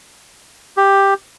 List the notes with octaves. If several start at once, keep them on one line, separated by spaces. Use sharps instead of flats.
G4